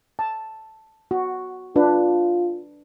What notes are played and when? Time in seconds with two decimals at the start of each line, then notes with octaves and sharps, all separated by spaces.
0.19 A5
1.11 F#4
1.76 D4 F4 B4